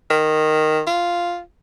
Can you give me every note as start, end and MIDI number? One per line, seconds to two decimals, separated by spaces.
0.10 0.82 51
0.87 1.41 65